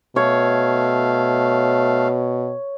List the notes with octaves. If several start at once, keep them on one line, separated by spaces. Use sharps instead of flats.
B2 A3 C#5 F5